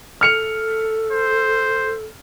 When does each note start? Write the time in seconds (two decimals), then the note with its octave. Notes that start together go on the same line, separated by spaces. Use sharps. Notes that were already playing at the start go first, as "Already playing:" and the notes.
0.21 A4 F6 C#7 F7
1.13 C5